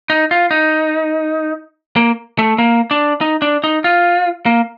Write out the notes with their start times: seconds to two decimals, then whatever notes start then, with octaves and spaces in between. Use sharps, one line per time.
0.10 D#4
0.31 F4
0.51 D#4
1.96 A#3
2.39 A3
2.58 A#3
2.91 D4
3.21 D#4
3.42 D4
3.64 D#4
3.84 F4
4.46 A#3